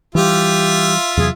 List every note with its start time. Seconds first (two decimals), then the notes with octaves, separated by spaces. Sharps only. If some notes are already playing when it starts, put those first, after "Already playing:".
0.15 E3 G3 F4 G4 E5
1.17 E2 C3 F#3 G#4